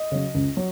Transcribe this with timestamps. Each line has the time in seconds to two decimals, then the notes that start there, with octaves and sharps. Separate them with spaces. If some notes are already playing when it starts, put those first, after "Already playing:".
Already playing: D#5
0.12 C#3 F#3
0.35 C#2
0.57 F#3